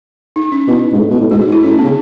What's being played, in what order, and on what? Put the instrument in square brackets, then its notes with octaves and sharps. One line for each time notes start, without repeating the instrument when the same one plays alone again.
[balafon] D#4
C#4
[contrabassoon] B2 [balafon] E4
[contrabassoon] G#2
A2
B2
A2
[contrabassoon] G#2 [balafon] F#4
[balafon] F#4
[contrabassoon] G#2
[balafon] E4
[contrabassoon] A2 [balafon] C#4
[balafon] B3
[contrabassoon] C#3